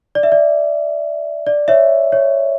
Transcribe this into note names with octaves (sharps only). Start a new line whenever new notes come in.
D5
E5
D5
D5
C#5 E5
C#5